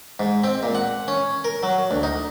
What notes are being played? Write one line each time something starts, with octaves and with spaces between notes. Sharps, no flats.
G#2
C4
A#2
F#5
C#4
A#4
F#3
D2
D#4